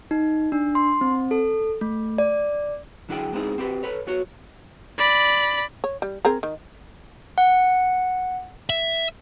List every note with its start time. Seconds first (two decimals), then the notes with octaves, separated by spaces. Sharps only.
0.11 D#4
0.52 D4
0.75 C6
1.01 C4
1.31 A4
1.81 A3
2.18 D5
3.09 D3 F#3 D4 E4 G#4 G5
3.32 G#3 B3 C4 D#4 E4 G#4
3.58 C4 G4 B4
3.83 A4 B4 C#5
4.07 B3 F#4 C#5
4.98 D5 B5
5.84 C#5
6.02 G3
6.25 C4 G#4 A#4
6.43 D#3
7.38 F#5
8.70 E5